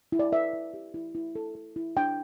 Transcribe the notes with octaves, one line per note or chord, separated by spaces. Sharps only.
E4
D5
B4 E5
E4
G4
E4
E4
A4
A4
E4
D4 G5